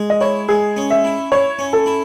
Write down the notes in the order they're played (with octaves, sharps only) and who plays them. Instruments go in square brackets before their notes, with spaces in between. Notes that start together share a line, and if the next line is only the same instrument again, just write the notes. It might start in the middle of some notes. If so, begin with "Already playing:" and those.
Already playing: [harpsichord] G#3
[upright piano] D#5
[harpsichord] E4 [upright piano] C#5
[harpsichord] G#3 [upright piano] G#4
[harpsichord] C#4
[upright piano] E5
[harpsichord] E4
[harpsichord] E4 [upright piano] C#5
[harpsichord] C#4
[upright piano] A4
[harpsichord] E4